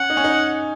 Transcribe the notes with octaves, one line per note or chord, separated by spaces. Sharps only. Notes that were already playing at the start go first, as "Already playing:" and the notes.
Already playing: C#4 F#5
D#4
C#4
D#4